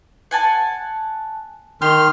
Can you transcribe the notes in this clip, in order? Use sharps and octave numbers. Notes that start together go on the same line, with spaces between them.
F#5 G#5 A5
D#3 G4 C6 F6